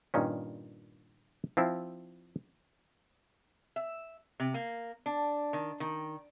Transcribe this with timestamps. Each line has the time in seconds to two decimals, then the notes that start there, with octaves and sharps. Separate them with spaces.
0.14 G2 A#2 D#3 C#4
1.57 F3 C4 E4
3.76 E5
4.40 C3
4.54 A#3
5.06 D4
5.53 D#3
5.80 D#3